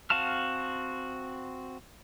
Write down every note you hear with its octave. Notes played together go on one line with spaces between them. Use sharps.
C4 F#4 F5 A5 F6